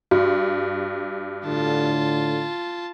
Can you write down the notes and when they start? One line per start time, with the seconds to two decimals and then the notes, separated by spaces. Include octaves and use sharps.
0.11 G2 F#4
1.46 A2 D3 F4 A5